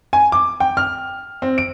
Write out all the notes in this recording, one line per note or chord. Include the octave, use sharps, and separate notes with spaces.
G#5
D6
G5
F6
C4
D7